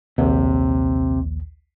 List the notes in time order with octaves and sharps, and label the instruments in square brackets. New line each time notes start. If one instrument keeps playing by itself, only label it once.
[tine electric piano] A#1 D#2 [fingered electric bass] C3